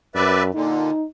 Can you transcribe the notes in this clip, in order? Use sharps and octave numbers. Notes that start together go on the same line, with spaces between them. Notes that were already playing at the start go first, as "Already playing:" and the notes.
F#2 B4 D5 E5
A#2 D3 D#4